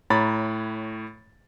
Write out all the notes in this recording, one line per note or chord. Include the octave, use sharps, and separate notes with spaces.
A2 C#5 A#5 B5 A6